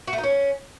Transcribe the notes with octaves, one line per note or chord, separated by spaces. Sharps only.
F#4
A3
D#4
C#4